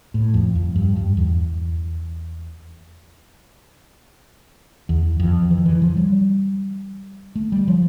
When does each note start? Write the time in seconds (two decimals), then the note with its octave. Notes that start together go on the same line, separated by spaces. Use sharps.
0.14 A2
0.34 F2
0.55 F2
0.76 G2
0.96 G2
1.17 E2
4.89 E2
5.20 F2
5.51 E3
5.66 E3
5.82 F3
5.97 G3
7.35 A3
7.52 G3
7.68 F3